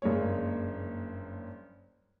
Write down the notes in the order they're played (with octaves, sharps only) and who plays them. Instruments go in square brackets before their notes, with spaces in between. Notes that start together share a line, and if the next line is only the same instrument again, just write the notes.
[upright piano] F#1 G2 G#3 A#3 C#5